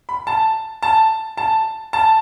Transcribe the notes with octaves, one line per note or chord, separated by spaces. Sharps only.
B5
A5
A5
A5
A5